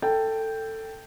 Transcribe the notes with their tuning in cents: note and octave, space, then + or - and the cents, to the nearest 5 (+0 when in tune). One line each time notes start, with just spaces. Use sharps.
A4 +15 G5 +0